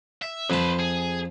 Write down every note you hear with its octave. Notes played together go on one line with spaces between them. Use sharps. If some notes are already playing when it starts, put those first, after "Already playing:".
E5
F2 B4 C5 A5
G#4